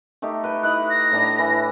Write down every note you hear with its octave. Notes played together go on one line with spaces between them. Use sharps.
A3 D#4 G4
B4 G5
D#4 E4 F#6
A#6
A2 D4 D#5
E3